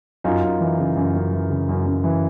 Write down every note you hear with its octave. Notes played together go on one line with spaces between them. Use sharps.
F#2 D#4 F4
F#2
E3
C#3
F#2
F#2
E3
C#3
F#2
F#2
E3